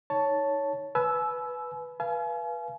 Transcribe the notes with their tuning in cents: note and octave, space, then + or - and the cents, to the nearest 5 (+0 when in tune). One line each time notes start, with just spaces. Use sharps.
D#4 +10 C#5 +10 A5 +0
B4 +0 G#5 +40 E6 +0
B4 -25 F5 -30 G#5 +35